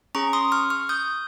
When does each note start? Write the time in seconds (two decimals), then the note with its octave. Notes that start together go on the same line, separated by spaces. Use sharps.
0.15 C#4 G#4 A#5 C#6
0.33 C6 D#6
0.52 C#6 F6
0.70 C#6 F6
0.89 D#6 G6